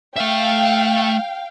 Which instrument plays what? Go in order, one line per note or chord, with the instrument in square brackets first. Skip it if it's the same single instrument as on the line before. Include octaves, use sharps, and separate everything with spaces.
[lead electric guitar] A3 E5 [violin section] F5 G5